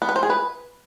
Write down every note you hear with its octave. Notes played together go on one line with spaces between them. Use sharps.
B3
B4
C5
G#4
B4